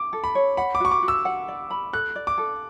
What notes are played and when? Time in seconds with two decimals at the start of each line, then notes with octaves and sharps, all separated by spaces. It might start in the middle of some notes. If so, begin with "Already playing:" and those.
Already playing: D6
0.13 A4
0.24 B5
0.35 C#5
0.57 F#5 B5
0.75 D6
0.80 F#4 C#6
0.91 D6
1.03 F#4
1.08 E6
1.25 F#5
1.48 D5
1.70 B5
1.93 A4 F#6
2.15 D5
2.27 D6
2.38 A4